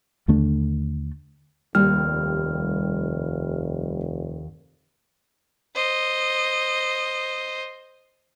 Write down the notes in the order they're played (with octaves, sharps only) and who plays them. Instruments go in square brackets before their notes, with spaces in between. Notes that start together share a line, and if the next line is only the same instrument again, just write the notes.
[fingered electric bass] D#2 D3 A3 D4
[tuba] F1 [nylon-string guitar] D#2 [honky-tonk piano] G3 [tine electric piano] F6
[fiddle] C5 D#5